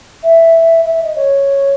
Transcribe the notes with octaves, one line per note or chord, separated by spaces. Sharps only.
E5
E5
D#5
C#5